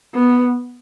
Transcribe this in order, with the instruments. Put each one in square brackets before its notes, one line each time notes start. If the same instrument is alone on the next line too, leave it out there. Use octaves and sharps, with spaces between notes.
[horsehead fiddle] B3